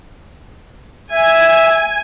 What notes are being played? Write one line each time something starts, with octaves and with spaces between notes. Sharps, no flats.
E5 G#5